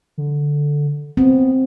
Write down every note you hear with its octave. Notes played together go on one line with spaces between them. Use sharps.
D3
B3 C4